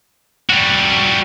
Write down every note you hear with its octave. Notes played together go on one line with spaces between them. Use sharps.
G3 F#4